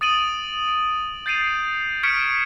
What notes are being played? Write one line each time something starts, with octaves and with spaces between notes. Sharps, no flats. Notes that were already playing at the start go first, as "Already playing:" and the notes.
D#6 A6 D7 D#7 F#7
D7
G6 A6 C7 D7 D#7 F7
C#6 F6 G#6 B6 C#7 D7